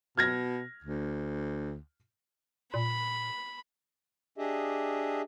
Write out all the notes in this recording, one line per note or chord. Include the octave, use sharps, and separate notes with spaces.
B2 F6 G#6 A#6
D2
A#2 B5
D4 G4 G#4 D#5 E5